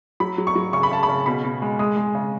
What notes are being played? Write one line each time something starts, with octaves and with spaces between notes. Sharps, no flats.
F#3 B5
F#3
C#6
F#3
C#3 C#6
B5
C#3 A5
B5
C#3
B2 B5
B2
G#3
G#3 D#6
G#3
C#3